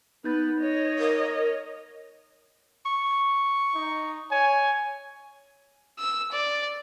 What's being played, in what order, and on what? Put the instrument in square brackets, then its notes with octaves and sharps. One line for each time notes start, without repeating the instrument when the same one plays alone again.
[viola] B3 B4 [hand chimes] D#4 G6 A6
[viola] C#5 D#5
[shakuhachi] A#4
[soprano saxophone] C#6
[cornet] D#4
[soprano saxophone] C#5 [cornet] G#5
[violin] E6
D5